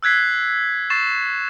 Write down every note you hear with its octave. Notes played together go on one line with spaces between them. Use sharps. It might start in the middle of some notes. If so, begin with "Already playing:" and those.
E6 F#6 G#6 B6 C7
C#6 A6 C7 E7